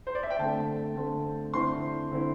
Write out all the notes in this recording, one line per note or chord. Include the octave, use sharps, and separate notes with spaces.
C5
D5
E5
G5
D3 A3 C4 A5
D3 A3 C4
D3 C4 E4 C6
D3 C4 E4